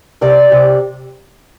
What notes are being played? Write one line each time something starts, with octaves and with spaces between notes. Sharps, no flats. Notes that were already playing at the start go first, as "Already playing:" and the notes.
C3 D5
C3